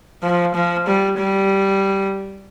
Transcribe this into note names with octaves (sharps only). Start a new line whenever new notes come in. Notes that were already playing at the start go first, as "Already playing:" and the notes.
F3
F3
G3
G3